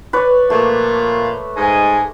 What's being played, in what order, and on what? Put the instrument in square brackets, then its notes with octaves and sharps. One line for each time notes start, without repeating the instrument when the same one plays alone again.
[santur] B4 C#5 D5
[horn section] A#2 F3 F5 [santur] A3
[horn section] G#2 D#5 G#5